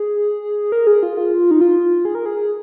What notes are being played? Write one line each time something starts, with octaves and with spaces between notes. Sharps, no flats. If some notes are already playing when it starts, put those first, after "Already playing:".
Already playing: G#4
A#4
G#4
F4
F4
D#4
F4
G#4
A#4
G#4